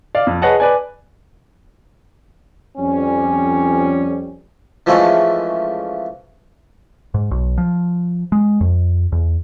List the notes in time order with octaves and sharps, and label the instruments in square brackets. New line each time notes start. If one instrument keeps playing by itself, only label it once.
[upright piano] D5 F5
F2
G#4 B4 C#5 D#5 F#5 A5
B4 D5 G#5
[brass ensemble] F2 G3 C#4
[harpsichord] E3 F3 G#3 A3 C#4
[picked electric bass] G#2
B1
F3
G#3
F2
E2